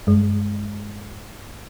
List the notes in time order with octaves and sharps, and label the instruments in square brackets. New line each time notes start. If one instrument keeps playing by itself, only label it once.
[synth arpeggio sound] G2 G#3